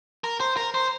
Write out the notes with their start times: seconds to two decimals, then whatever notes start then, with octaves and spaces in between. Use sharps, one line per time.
0.24 A#4
0.40 C5
0.57 A#4
0.74 C5